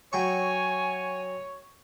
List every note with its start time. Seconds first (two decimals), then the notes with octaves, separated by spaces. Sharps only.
0.13 F#3 C#5 G5 G#5 C#6